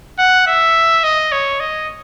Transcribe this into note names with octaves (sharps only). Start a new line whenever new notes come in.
F#5
E5
D#5
C#5
D#5